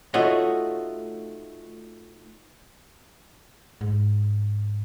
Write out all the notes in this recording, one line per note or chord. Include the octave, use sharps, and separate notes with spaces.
A3 D#4 F4 F#4 C#5 D#5
G#2